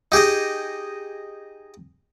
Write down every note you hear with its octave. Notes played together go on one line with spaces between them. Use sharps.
D#4 G4 G#4 D#5